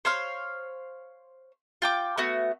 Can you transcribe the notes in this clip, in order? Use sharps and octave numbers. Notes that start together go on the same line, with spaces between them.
C5 C#5 F5 C6
F4 G5 D6
A3 B3 F#4